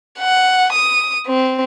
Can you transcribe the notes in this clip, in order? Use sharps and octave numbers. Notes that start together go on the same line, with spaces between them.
F#5
D#6
C4